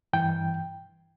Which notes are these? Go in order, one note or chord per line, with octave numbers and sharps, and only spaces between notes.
G2 E3 G5